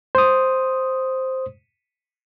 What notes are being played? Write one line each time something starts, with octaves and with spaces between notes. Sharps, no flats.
C5 D#6